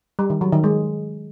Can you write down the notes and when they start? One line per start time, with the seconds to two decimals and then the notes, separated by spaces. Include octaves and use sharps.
0.19 G3
0.30 D#3
0.41 F#3
0.52 D#3
0.64 G#3